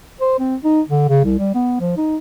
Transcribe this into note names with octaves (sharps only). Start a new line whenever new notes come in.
C5
C4
D#4
D3
C#3
C2
G3
B3
F3
D#4